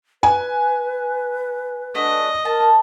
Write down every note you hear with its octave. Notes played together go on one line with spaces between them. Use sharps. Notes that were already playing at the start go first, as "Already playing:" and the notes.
B4 G#5
A3 D4 F#4 D#5
A#4 A5